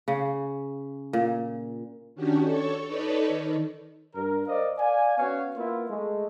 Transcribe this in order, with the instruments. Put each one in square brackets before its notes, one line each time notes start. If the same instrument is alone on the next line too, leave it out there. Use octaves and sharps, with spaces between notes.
[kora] C#3
A#2
[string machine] D#3 C#4 D4 F#4 G4
A4 C#5 C#6
D#4 A4 B4 C#5 D5
D#3
[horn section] G2 A#4
A#4 C5 D5 D#5 F5
D5 F5 G#5
B3 C#4 F#4 C#5 F5
A#3 B3 E4 F4
G#3 A3